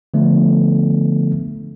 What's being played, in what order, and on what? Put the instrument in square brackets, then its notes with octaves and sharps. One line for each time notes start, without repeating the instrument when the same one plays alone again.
[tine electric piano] D3 F3 A3 B3